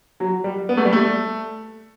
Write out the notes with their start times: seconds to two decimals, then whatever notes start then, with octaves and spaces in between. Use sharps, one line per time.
0.20 F#3
0.44 G3
0.69 B3
0.77 A3
0.85 G3
0.93 A3